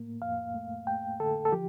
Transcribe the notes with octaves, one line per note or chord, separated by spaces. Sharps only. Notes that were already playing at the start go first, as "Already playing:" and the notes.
Already playing: A2 A#3
F2 F5
A3
A3 G5
D3 A4
A4
F3 G4